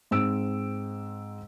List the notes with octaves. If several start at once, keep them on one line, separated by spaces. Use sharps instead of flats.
G#2 C4 E6 D7